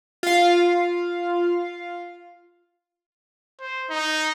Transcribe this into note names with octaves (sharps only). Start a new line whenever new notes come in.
F4 F5
C5
D#4